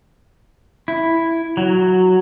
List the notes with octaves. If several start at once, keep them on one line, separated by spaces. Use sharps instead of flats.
E4
F#3